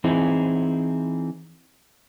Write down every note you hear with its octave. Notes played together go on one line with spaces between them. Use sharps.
E3 C4 D#4 E4 G#4